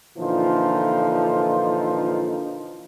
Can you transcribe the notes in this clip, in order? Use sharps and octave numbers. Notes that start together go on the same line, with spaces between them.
A#2 D3 E3 F3 D#4 F4